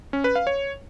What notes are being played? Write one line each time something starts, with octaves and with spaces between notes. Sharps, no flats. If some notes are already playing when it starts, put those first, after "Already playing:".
C#4
B4
F5
C#5